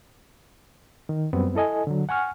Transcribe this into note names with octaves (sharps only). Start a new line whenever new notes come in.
D#3
F#2 G3 B3 C4
E4 A4 D#5 G#5
D3 F#3
F#5 G#5 C#6 F6